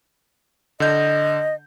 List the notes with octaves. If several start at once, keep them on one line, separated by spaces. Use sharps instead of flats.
D3 D#5 G6